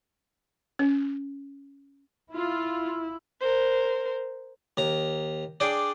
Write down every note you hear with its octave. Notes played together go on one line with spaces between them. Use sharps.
C#4
E4 F4
A#4 C5
D#2 A#5
D4 G#4 D5 G5